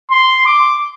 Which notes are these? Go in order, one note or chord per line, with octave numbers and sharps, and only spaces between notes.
C6
D6